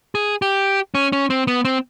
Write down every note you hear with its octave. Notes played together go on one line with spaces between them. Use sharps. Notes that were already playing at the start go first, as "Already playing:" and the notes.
G#4
G4
C#4
C#4
C4
B3
C4